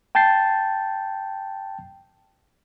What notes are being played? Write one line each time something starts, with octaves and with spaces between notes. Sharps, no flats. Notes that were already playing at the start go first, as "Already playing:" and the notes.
G5 A5 G6 A6 C7